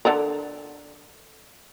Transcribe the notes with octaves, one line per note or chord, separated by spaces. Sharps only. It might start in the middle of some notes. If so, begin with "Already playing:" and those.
D3 A4 A#4